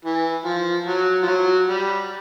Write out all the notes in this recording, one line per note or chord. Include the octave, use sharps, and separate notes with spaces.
E3
F3
F#3
F3
F#3
G3